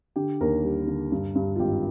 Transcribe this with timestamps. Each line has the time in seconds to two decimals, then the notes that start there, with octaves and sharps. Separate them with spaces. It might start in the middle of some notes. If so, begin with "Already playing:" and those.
0.16 D3 G4
0.41 D#2 A#4
0.64 G3
0.87 D3
1.12 G2
1.35 G2
1.56 F4
1.59 G#1 G4